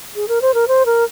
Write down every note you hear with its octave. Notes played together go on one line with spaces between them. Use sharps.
G#4
A#4
C5
A#4
C5
A#4